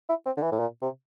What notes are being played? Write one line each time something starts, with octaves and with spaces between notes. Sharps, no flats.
E4
C4
D3
E3
A2
A#2
C3